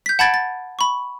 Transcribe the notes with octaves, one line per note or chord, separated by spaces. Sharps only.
G6 B6
F#5 A5 B5 G#6 A6 D7
A6
B5 C#6